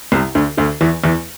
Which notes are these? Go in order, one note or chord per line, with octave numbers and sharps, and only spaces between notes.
C2 C3
D2 D3
D2 D3
E2 E3
E2 E3